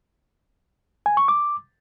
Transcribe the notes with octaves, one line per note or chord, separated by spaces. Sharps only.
G#5
C#6
D6